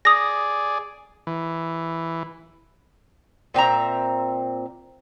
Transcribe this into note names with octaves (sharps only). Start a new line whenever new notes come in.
G#4 D5 D#6 A#6
E3
A#2 C4 E5 A#5